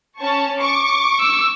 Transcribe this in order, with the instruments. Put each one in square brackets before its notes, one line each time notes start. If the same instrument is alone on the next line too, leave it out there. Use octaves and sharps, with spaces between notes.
[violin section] C#4 A5 C#6
C#6 D6
[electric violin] E6